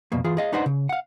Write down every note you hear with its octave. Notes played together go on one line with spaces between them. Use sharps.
C2 F2 B2 A#3
E3 F4 G#4
G#4 D#5 F5
D4 D#4 B4 C5 D#5 F#5
C#3
F5 F#5